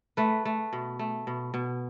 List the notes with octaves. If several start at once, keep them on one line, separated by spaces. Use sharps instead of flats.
A3 B4
A3
B2
A3
B2
B2